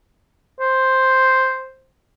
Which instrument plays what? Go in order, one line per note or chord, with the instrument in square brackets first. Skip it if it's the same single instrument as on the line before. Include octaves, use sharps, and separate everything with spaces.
[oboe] C5